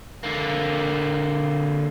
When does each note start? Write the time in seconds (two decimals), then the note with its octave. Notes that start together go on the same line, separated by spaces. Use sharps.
0.23 D3 A#3